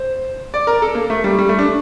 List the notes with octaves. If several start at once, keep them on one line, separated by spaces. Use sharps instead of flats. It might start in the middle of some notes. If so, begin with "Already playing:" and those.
Already playing: C5
D5
A#4
A4
A#3
A3
G3
G3
A3
D4